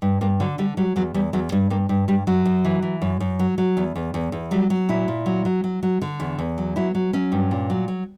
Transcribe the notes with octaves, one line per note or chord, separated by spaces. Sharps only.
G2
G2 A#3
D3 F#3
D3 G3
F#3 G3
E2 F#3
E2 G3
E2 F#3
G2 G3
G2 A#3
G2
G2 G3
F#2 F#3
F#2
E3
E3
F#2
F#2
F#3
F#3
E2
E2
E2
E2
F#3 G3
F#3
A#2 E4
A#2
F#3
F#3
F#3
F#3
D3
E2
E2
F#3
F#3 E4
F#3
F#3 C#4
G2
A#2
F#3
F#3